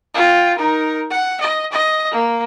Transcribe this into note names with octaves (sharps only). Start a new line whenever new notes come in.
F4 G5
D#4 A#4
F#5
D#5
D#5
A#3